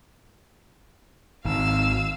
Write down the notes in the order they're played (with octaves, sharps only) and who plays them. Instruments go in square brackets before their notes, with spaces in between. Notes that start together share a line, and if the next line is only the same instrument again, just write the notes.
[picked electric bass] G#1 [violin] F5 E6